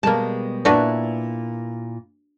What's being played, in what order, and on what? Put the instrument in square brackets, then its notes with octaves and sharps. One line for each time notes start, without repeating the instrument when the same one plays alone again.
[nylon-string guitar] B2 G3 G#3 [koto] A#3 A5
[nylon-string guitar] A#2 E4 [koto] D4 F#4 B4